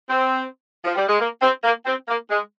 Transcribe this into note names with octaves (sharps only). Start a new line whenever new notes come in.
C4
F3
G3
G#3
A#3
C4
A#3
C4
A#3
G#3